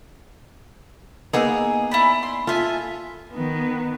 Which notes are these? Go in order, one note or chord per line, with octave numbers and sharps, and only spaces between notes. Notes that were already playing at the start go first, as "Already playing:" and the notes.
A#3 B3 D#4 G#4 E6
E4 D5 B5
C6
F4 A4 E5 G#5
D#3 B3